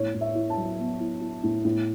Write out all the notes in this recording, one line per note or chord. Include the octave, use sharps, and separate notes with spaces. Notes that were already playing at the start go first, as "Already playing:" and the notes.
Already playing: A2 C#5
A2
E5
E4
A5
F#3
B3
E4
E4
A2
A2